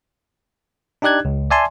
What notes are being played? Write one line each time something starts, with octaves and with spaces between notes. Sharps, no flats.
D4 D#4 G4 D5 F#6 G#6
C#2
D5 E5 G#5 A5 C6